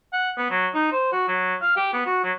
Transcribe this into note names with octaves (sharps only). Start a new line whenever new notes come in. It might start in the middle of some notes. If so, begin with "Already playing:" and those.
F#5
B3
F#3
D#4
C5
F#4
F#3
F5
G4
B3
F#4
F#3